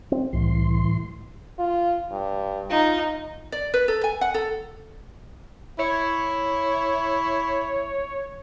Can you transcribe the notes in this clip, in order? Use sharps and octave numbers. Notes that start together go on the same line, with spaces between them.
C4
C2 A2 E3 C6
F4
G2
D#4 F4
D5
B4
A4
G#5
F#5
A4
E4 C#5